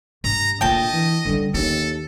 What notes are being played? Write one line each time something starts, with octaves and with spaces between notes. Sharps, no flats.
G2 A#5
A#2 D3 D4 D#5 G5 A5
E3
D3 G3 C#4
D#2 C#4 A4